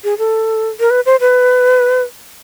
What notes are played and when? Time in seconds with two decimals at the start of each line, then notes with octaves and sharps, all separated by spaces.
0.04 G#4
0.18 A4
0.80 A#4
0.90 B4
1.06 C5
1.21 B4